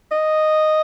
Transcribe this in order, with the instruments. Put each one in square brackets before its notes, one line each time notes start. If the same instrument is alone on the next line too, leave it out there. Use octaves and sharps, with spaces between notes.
[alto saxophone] D#5